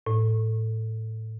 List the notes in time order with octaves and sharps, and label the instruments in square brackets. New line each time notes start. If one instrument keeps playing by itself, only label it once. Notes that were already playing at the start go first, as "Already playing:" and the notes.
[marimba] A2